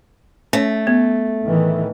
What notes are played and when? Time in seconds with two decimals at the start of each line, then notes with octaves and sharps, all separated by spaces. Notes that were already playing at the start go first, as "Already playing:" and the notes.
0.53 A3 C#4 C#5
0.87 B3
1.43 A2 D#3 E3